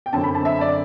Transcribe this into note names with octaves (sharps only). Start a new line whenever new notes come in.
G5
F#2 D3 F#3 C4 A5
B5
A5
E5
D5